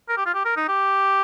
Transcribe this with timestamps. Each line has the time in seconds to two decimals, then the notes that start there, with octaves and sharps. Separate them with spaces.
0.09 A#4
0.17 G4
0.26 F4
0.34 G4
0.45 A#4
0.57 D#4
0.68 G4